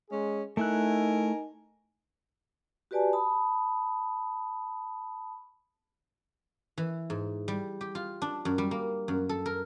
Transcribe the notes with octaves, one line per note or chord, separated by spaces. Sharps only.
G#3 C#4 G#4
A3 D#4 E4 A#4 G#5 F#6
F#4 G4 B4 D5 G#5 A5
A5 B5 D#6
E3
G#2
G3
G4
F4
D4
F#2
G3
A#3
F#2
A4
A#4